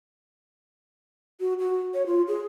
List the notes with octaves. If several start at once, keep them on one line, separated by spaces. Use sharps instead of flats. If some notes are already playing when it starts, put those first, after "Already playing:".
F#4
F#4
C#5
F4
G#4